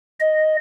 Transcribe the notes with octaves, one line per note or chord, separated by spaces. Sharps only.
D#5